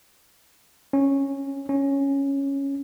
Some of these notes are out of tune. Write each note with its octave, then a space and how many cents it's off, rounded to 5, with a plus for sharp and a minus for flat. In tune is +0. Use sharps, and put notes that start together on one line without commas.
C#4 -10
C#4 -5